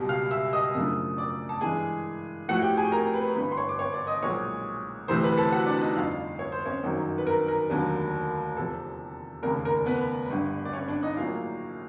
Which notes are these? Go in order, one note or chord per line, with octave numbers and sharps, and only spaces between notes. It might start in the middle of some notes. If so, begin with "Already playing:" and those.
Already playing: C#2 B2 G3
F5 F6
E5 E6
D#5 D#6
F#2 C#3 F3 A3 D4
D5 D6
A5
G2 E3 G#3 G#4 G#5
A2 F3 A3 F#4 F#5
G4 G5
G#4 G#5
A#4 A#5
B4 B5
A1 G2 D3 B4 B5
C6
C#5 C#6
D6
C#5 C#6
D5 D6
D#5 D#6
B1 A#2 F3 G#3 C#5 C#6
D2 C3 E3 A3 C4 C5 C6
B4 B5
A4 A5
F#4 F#5
D4 D5
D#4 D#5
G1 F2 D3 F4 F5
C#5
C5
C#4 C#5
G1 F#2 D#3 F#3
B4
A#4
A#4
F1 D#2 D3 F#3
E2 C3 F3 A4
F1 D#2 C#3 A#4
A#4
B3 B4
G1 G2 D3
D5
C#4 C#5
D4 D5
D#4 D#5
A#1 A2 F#3 A#3 F4 F5